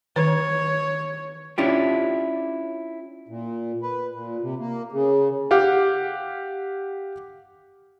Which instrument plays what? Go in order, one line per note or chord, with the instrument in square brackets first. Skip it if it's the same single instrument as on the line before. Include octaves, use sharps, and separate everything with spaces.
[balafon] D#3 [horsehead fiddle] C#5
[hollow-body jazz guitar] C#4 D4 E4 F4 G4
[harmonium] A#2
B4
A#2
C3
A#3
C#3
[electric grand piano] G4 F5 F#5